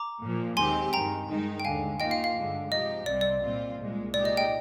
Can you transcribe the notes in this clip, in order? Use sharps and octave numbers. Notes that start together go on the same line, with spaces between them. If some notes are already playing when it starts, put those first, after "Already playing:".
Already playing: A#5 D6
A#2 F3 A#3
D#2 D#3 G#3 C4 G4 G#5 C6
G2 D#3 G#3 G5 A#5
G2 D#3 G#3 D#4
G5
D#2 D3 G#3 F5 G#5
D#3 A#3 F4 D#5 G5
F5
F5
G2 D3 G#3
C3 F3 G#3 D#4 G4 D#5
C2 C3 G3 C4 D5
D5
A#2 G3 C4 F4
C2 A#2 G#3
A#2 G#3 D#4 G4 D5
D#5
D#5 G5